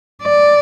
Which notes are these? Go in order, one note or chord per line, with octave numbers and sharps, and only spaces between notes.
D5